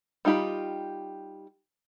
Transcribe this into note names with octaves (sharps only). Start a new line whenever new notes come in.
G3 D#4 F4 G4 B5